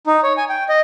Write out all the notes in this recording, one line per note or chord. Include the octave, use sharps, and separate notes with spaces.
D#4
C#5
G#5
G5
D#5